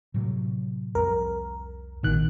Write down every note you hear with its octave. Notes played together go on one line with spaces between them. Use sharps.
A2 C3 F#3
C2 F2 A#4
A1 B2 D#3 F#6